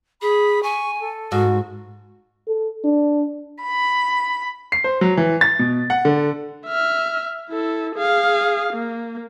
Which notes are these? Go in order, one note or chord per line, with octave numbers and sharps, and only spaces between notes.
G#4 B5
G#5 C#6
A4
G#2 F#4
A4
D4
B5
C7
C5
F#3
E3
A6
B2
F#5
D3
E5 F6
E4 A4
G#4 F5
A#3